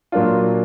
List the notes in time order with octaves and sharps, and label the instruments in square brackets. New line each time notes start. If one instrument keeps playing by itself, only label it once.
[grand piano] A#2 F#3 A#3 D4 F4